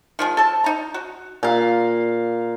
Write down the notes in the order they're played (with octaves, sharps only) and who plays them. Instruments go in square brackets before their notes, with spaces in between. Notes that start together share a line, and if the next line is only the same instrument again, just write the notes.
[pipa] D#3 F3 G#3
A4 A5
D#4 A#5
F#4
[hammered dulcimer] A#2 F5 [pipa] G4